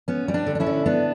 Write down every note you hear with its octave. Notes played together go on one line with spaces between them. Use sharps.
B3 C#4
G3
D4
D3
D4
C#4 E4
D3
B3 D4